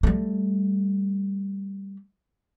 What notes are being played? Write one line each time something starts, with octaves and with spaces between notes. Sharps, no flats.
G3 A3